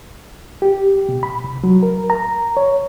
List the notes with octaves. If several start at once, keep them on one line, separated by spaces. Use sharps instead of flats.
G4
B2
B5
C2
F#3
A#4
A#5
C#5